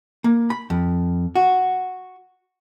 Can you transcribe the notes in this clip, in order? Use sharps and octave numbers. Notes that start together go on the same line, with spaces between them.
A#3
B5
F2
F#4